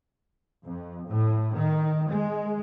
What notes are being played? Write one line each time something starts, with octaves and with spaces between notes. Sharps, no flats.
F2
A2
D#3
G#3